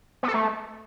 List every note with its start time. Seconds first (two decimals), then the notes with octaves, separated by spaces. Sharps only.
0.23 B3
0.28 A4
0.34 A3